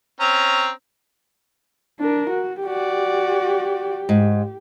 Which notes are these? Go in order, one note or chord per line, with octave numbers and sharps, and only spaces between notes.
C4 C#4 A#5
D4 A#4
F#4
F#4 G4 D5
G#2